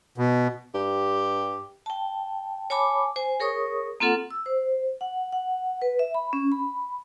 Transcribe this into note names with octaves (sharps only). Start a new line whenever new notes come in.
B2
G2 G4
G5 A5
C#5 G#5 A5 B5 D6
C5 G#5
G#4 A#4 C#5 C#6 D#6
A#3 C4 F4 A4 F#5
E6
C5
F#5
F#5
B4
E5
B5
C#4
B5